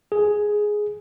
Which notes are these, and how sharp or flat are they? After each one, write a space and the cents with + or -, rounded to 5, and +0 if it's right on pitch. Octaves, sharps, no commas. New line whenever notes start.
G#4 +5